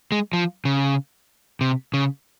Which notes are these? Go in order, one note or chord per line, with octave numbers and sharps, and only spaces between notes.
G#3
F3
C#3
C3
C#3